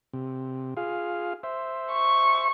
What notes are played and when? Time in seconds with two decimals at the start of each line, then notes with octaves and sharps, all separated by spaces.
0.13 C3
0.77 F4 G#4 F5
1.43 C5 E5
1.93 C#6